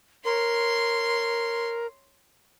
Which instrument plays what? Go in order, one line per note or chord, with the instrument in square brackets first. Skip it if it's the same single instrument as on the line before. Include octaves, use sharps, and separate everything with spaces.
[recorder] A#4 [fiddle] C#5 C6